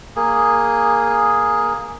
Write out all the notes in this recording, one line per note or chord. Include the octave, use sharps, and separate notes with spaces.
A#3 G#4